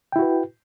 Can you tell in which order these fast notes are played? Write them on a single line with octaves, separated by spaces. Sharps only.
G5 E4 F#4 B4